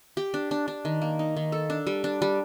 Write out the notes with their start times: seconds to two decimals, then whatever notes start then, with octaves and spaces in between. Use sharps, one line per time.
0.17 G4
0.34 D4
0.51 D4
0.68 D4
0.85 D#3
1.01 A#3
1.19 D#4
1.37 D#3
1.52 A4
1.70 D4
1.87 G3
2.04 D4
2.22 G3